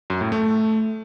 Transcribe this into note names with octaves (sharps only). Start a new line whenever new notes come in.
F#2
A2
A3